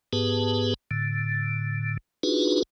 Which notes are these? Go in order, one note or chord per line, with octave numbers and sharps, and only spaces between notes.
G#2 B3 G4 G#4 B4 A5
A2 D3
D4 D#4 F4 F#4 G#4 B4